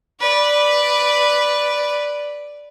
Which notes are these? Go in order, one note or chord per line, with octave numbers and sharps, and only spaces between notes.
B4 D5